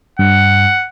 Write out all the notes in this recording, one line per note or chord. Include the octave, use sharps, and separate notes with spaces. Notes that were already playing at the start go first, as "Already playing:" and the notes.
G2 F#5